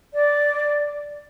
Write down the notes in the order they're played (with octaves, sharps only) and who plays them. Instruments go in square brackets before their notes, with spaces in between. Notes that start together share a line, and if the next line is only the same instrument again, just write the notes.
[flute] D5